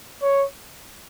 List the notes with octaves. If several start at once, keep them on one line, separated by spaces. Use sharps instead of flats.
C#5